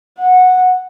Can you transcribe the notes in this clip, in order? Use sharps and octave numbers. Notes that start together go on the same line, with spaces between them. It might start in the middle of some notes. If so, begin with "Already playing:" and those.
F#5